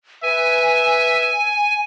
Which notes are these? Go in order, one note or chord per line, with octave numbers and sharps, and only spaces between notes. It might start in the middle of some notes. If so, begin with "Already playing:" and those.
B4 E5 G#5